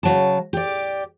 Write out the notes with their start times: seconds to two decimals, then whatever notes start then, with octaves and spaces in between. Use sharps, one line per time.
0.03 C#3 F#3 A5
0.53 G4 D5